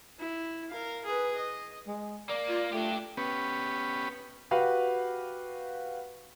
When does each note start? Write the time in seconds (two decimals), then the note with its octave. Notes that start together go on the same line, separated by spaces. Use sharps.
0.19 E4
0.70 A#4 F5
1.05 G#4 B4
1.36 D#5
1.87 G#3
2.29 A#3 D5
2.48 F4
2.73 A3 D4 G4
3.17 B3 C#4 G4 B4
4.51 F#4 G4 B4 F5